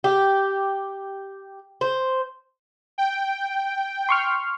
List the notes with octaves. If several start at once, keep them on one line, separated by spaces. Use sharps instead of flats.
G4
C5
G5
C6 C#6 F6